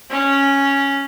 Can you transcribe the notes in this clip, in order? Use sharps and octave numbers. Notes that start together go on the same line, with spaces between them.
C#4